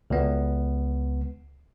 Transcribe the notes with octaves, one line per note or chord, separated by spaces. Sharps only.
C#2 B3